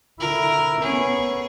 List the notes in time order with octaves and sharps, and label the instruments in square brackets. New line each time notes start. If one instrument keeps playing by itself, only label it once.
[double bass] D3 E4 [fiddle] A#4
[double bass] B3 C#4 [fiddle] G#4 C#5